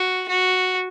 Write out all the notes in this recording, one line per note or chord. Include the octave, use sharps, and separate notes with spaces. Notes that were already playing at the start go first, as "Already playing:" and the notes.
Already playing: F#4
F#4